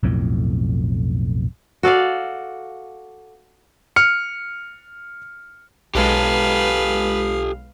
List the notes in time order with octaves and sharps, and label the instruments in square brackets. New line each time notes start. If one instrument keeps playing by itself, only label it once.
[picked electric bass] B1 F2 A2
[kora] F#4 A4 D5 F5
[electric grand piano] F6 C#7
[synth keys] B1 G#3 [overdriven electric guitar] G4 A4 [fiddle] B4 [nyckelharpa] F5